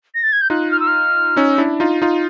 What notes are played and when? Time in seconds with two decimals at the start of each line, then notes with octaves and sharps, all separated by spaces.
0.15 A#6
0.23 A6
0.32 G#6
0.41 G6
0.50 D#4 F4 F#6
0.71 F6
0.80 E6
0.87 F6
1.37 C#4 D#4 E6
1.58 D4 E4
1.80 D#4 F4
2.02 D#4 F4